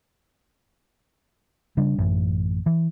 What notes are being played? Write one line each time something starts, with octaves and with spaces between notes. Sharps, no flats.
C#3 G3 D4
A1 F#2
E3